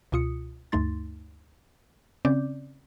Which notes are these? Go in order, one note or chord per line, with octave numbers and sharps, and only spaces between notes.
C#2 B2 F4 D#6 C#7
D2 G2 A3 D#4 C6 A6
C#3 C4 C#4 D5 D6 G6